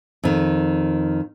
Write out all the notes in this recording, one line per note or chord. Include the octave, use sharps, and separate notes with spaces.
F2 D#3